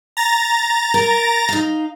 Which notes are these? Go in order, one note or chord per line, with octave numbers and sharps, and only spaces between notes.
A#5 A6 A#6
A#4
D#4 F5